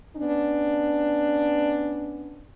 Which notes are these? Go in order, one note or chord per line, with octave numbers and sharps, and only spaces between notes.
B3 C#4 D4